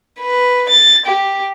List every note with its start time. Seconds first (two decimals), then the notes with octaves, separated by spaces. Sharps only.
0.20 B4
0.69 A6
1.06 G4